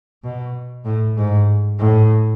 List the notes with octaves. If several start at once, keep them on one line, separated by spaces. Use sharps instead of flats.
B2
A2
G#2
A2